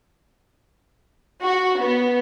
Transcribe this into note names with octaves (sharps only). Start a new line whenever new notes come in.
F#4
B3